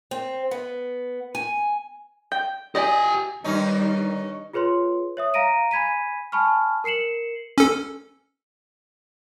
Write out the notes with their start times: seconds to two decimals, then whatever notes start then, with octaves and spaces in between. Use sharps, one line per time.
0.11 C4
0.51 B3
1.35 G#5
2.32 G5
2.75 E4 G4 D5 D#5 G#5
3.44 G2 D#3 G3 C#4 D#4
4.53 F4 G#4 B4 C#5 C6
5.17 C#5 E5 D#6
5.34 F5 A#5 A#6 D7 D#7
5.71 G#5 B5 G#6 B6 D#7
6.32 G#5 A5 B5 C#6 F6
6.84 A#4 C7 C#7 E7 F#7
7.58 C#4 A4